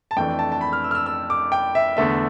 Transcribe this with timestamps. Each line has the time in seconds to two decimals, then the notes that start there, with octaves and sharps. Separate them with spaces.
0.11 A5
0.16 F2 E3 A3 D4 G5
0.39 A5
0.52 A5
0.61 B5
0.73 F6
0.84 E6
0.91 F6
0.95 E6
1.06 E6
1.30 D6
1.52 G5
1.75 E5
1.97 E2 D3 A3 E5